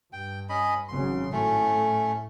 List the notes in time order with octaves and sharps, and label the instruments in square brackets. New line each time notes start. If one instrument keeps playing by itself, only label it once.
[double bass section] G2 [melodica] G5
[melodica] C#4 D#5 B5
[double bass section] G#1 C#3 F#3 [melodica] C6
[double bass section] A2 [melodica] A3 C#4